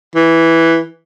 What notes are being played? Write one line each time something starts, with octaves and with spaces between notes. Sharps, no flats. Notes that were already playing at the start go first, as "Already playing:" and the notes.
E3